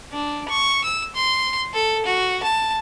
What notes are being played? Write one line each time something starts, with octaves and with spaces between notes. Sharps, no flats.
D4
C#6
E6
C6
A4
F#4
A5